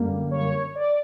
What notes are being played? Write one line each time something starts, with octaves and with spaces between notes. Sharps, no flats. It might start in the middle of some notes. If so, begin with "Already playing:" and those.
Already playing: F#2 D3 G3 A#3
C#5
D5